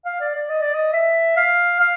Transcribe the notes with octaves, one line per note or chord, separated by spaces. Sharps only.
F5
D5
D5
D#5
D5
D#5
E5
F5
F5